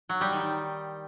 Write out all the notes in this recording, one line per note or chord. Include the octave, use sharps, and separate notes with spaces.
F#3
G3
D#3